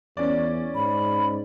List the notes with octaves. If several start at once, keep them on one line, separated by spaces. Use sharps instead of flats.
E2 C#4 D5
G#2 B5